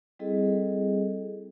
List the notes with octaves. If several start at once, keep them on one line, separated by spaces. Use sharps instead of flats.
G3 C4 E4 G#4 A4 D#5